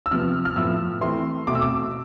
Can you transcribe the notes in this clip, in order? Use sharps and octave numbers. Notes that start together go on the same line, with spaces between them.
E6
C3 F3 B3 F6
F6
A2 F3 B3 E6
E3 A3 C4 C6
B2 A3 C4 D6
E6
D6